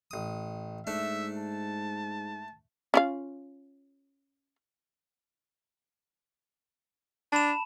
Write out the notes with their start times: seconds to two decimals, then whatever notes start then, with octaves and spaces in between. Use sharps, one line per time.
0.11 A1 D#6
0.87 G#2 A3 D4 E5
1.38 A5
2.94 C#4 F4 F5
7.32 D4 A5 B5 E7